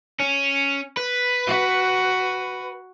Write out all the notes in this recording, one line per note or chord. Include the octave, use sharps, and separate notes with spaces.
C#4
B4
F#4